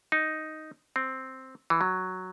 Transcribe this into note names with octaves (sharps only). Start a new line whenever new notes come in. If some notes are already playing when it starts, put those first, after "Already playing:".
D#4
C4
E3
F#3